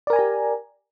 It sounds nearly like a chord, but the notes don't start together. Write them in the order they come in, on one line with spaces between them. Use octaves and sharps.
D5 A#4 G#5 A#5 G4